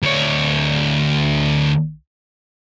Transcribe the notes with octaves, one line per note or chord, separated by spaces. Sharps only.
D2 C#5